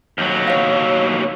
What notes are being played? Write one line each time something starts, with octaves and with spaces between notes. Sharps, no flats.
D#2 F#3
C#5 F5